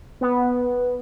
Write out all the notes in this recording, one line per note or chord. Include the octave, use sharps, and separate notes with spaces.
B3